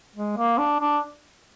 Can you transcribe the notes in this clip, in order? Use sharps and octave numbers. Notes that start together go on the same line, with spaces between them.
G#3
A#3
D4
D4